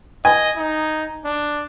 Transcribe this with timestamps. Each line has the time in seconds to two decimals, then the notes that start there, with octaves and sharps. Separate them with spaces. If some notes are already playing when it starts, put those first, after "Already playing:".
0.25 D#5 G#5
0.57 D#4
1.25 D4